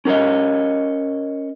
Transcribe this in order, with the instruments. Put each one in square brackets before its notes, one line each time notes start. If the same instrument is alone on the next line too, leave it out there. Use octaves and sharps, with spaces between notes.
[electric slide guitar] C#4 A#4 C5 C#5 D#5